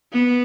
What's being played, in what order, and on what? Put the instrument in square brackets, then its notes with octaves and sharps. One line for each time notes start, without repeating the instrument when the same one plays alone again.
[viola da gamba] B3